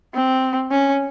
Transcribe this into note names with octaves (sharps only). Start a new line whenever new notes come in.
C4
C#4